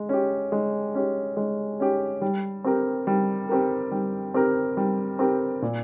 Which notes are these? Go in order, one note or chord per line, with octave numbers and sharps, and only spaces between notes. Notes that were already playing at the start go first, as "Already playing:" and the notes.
Already playing: G#3
C#4 G4
G#3
C#4 G4
G#3
C#4 G4
G3
C4 G4 A#4
G3
C4 G4 A#4
G3
C4 G4 A#4
G3
C4 G4 A#4
A#2